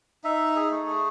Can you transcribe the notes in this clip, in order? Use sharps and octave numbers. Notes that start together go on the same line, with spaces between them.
D#4 E5
G#4
A3
G#4